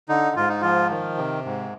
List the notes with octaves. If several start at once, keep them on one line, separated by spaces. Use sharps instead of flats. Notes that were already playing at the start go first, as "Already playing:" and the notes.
D3 D#4
G#2 F4
D#4
F3 F4
D#3
C3
G#2